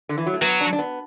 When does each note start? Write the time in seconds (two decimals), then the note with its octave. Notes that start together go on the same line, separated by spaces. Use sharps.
0.09 D3
0.18 E3
0.26 F#3
0.34 A3
0.42 F#3 B3
0.61 D4
0.73 D4
0.79 B3